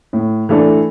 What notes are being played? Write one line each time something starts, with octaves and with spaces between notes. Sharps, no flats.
A2
E3 A3 D4 A4